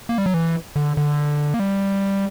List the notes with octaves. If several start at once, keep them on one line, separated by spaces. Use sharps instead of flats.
A#3
G3
F#3
E3
D3
D3
A#3
G3